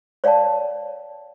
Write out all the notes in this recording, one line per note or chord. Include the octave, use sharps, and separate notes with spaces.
C#5 D5 F5 G5 A5